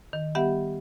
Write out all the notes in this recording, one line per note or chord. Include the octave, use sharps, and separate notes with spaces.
D#3
G3 B3 G4 E5 F#5